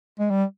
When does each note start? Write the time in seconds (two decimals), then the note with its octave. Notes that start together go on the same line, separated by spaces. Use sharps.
0.20 G#3
0.30 G3